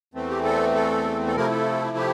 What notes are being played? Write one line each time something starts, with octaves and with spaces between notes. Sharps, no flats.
E2 E3 A3 C4
G4
A4
A4
A4
C3 F3 A3 E4 A#4
A4
G4